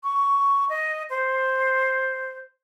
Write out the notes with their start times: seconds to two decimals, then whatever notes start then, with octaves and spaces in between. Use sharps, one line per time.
0.04 C#6
0.69 D#5
1.10 C5